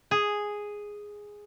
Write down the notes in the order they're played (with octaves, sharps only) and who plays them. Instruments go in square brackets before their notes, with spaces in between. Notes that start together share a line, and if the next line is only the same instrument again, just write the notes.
[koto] G#4